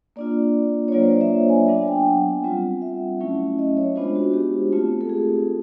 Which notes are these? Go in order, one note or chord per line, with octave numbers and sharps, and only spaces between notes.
A#3 D4 F4 D5
C#5
F#3 A#3 D4 F4 D5
C5
D5
E5
G#5
F#3 B3 D4 G#5
G5
F#5
G3 C4 F4
E5
F#3 A3 C#4 E4
D#5
C#5
G#3 B3 D4 F4 C5
F#4
G4
A3 C4 F4
A4
G#4